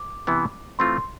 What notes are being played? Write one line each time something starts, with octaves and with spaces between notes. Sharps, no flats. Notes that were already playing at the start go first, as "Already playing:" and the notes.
Already playing: D6
C3 E3 B3 E4
E3 A3 C4 F4 C6